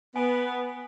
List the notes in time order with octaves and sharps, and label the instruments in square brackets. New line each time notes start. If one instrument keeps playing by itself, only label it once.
[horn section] B3 [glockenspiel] G#5